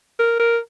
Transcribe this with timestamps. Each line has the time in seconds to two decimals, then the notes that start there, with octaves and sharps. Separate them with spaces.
0.19 A#4
0.39 A#4